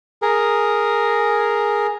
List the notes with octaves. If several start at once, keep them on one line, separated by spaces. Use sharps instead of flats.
G#4 A#4